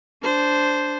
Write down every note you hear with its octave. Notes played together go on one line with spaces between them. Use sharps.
D4 C5